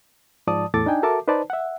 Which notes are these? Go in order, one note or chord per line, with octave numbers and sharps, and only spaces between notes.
G#2 F3 D5 A5 D#6
E2 A2 A4 D6 A6
D4 D#4 G5 G#5
F#4 A4 A#4 E5 A5 D6
D#4 B4 C5 D5 A5
E5 F#5